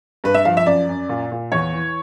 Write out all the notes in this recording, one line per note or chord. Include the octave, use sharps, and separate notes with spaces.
G2 B4
E5
F3 F5
E5
F#2 D5
F#2
A#2
A#2
E2 C#5
E3